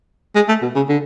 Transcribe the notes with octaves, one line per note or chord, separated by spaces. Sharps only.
G#3
A3
B2
C#3
D3